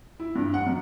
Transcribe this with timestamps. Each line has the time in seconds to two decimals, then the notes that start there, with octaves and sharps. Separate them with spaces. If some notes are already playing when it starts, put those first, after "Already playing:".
0.20 E4
0.35 G2
0.54 F#5
0.66 F#2